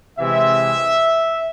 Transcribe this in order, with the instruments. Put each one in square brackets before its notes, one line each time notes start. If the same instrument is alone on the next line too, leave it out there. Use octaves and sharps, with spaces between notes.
[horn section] C3 E3 G#3 E5